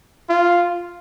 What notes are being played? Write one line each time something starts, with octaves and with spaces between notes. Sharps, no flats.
F4